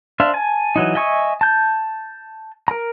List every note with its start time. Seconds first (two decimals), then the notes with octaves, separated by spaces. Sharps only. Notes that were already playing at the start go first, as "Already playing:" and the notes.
0.20 D4 C5 E5 F5
0.34 G#5 A5
0.76 E3 F#3 D#4
0.95 D#5 E5 G#5 C#6 D#6
1.41 A5 G6
2.68 A#4 A#5